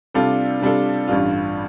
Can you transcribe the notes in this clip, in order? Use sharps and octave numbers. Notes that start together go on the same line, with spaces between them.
C3 G3 D4 F4 A4
C3 G3 D4 F4 A4
A1 G2 G3 F4